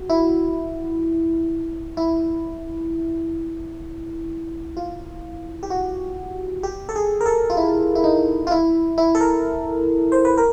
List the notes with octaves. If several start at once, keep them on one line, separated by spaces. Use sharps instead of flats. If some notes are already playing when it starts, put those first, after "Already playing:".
Already playing: F#4
E4
E4
F4
G4
F#4
G4
A4
G#4
A#4
A4
F4
E4
E4
D#4
F4
E4
E4
A4
A#4
C5
B4
A#4